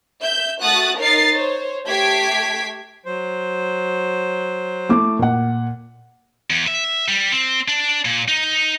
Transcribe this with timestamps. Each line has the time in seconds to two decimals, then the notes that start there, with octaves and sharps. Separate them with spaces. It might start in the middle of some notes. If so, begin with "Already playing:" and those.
0.22 E5 G6
0.62 A3 F#4 D#6 F#6 A6
0.99 D#4 A#4 C#5 A6 C7
1.31 C5 C#5
1.87 A3 G4 G#6 B6 C7 D7
3.06 F#3 C5
4.89 A3 E4 D6
5.19 A#2 F#5
6.50 E2
6.67 E5
7.08 G3
7.32 C4
7.68 D4
8.05 A#2
8.28 D#4